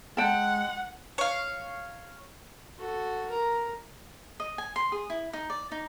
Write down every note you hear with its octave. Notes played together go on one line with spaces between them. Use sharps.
G#3 F#5 G5 A5
C#5 F5
F#4 A4
A#4 A#5
D#5
G#5
C6
G#4
E4
D#4
D5
D#4